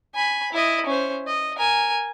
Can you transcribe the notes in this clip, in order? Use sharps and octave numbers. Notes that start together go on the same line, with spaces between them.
G#5 B5
E4 D#5
C#4 C5
D#5
A#4 G#5